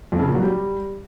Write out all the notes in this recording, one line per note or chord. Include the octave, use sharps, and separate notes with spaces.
F2
C#3
A#2
F#3
G3